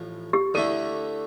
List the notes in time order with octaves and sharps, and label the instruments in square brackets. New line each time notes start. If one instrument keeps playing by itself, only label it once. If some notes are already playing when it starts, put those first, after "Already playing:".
Already playing: [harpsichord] A1 A2 F3
[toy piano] G4
[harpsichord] D2 D3 A3 E4 [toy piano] A4